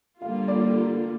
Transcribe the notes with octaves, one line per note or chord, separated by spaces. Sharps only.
D3 G3 A#3 F4 F5
D5